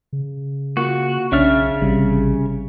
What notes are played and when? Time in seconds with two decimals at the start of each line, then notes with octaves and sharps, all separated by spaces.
0.13 C#3
0.77 A#3 F4 F#4 C#6
1.32 B1 C#3 C#4 D4 E5 F6 A6
1.82 A1 C3 G3